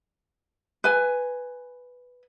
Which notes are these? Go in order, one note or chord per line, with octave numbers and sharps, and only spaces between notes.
B4 G#5